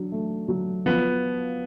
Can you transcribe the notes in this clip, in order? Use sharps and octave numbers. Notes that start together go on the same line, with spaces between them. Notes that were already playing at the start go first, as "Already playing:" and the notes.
Already playing: F#3 D4
A3
F#3
F3 B3